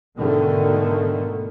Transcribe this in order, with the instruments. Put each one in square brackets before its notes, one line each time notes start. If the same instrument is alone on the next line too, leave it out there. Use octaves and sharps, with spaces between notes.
[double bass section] G#2 B2 D3 D#3 A3